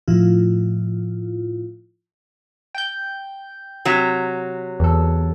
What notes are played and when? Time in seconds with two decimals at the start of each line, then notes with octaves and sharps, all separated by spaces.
0.08 A2 F3 E4 F4
2.75 G5 G6
3.85 C3 F#3
4.80 E2 A4